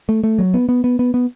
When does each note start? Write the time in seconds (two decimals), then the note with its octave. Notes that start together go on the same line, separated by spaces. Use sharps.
0.09 A3
0.24 A3
0.39 F#3
0.54 B3
0.69 B3
0.84 B3
0.99 B3
1.14 B3